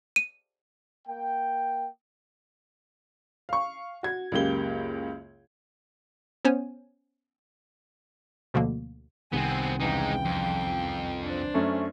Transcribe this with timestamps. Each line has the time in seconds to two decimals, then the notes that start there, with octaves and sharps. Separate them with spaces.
0.16 D#7
1.08 A#3 G5
3.49 F5 C#6
4.03 F#4 G#6
4.32 C#2 F#2 A#3 G4 G7
6.45 B3 C#4 C5 C#5 G#5
8.54 D2 B2 D3 F3 A#3
9.33 C2 C3 D#3 B3 C4 F#5 G#5
9.80 E2 C#3 G#3 D#4 G5
10.25 F2
11.23 D4 C5
11.54 F#2 A3 C#4